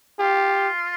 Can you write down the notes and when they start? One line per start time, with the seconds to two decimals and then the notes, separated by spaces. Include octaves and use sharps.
0.20 F4 G4